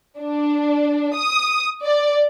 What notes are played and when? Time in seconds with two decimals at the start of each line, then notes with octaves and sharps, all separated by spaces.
0.19 D4
1.15 D#6
1.83 D5